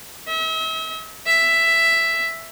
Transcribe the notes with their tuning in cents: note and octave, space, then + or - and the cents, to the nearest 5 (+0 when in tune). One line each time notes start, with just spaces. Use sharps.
E5 -40
E5 +5